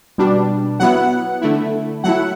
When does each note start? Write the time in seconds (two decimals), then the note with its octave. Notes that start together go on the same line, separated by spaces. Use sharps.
0.18 B2 G3 D4
0.80 F#3 B3 E4 F#5
1.42 D3 A3 E4
2.04 F#3 A3 E4 F#5